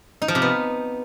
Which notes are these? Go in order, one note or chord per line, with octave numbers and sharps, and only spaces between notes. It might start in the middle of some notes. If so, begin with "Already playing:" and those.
D#4
F3
C3
B3